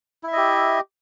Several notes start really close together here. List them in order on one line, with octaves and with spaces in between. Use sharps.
E4 E5 D#5 G4